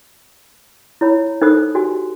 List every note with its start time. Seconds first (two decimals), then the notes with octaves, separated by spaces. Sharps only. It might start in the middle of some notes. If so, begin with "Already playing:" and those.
1.01 E4 C#5 B5
1.41 D#4 A4 C5 B5 D#6
1.75 F#4 G4 G#5